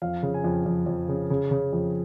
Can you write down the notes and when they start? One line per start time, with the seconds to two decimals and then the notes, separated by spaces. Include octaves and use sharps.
0.02 F2 F5
0.23 C#3
0.34 G#5
0.44 F2
0.66 F2
0.86 F2
1.09 C#3
1.30 C#3
1.51 C#3
1.73 F2